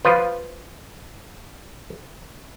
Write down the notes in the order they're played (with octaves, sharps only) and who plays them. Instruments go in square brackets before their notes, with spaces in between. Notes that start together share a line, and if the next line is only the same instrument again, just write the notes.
[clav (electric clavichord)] F3 F4 B4